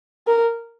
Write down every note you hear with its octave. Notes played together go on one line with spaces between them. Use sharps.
A#4